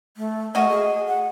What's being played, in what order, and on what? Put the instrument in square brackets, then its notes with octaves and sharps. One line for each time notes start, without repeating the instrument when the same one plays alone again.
[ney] A3
[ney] A3 [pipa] F#4 D#5
[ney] G#4
F#5